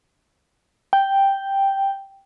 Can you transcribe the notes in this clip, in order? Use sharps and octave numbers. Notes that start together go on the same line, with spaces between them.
G5